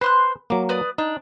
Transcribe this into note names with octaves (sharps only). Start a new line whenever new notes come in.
B4 C5 C6 F#6
F#3 A#3 D6
B4 D5 D#6
D4 D#4